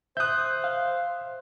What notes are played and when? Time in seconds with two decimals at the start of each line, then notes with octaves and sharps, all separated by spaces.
0.17 C5 E5 D#6 F#6 G6
0.64 F5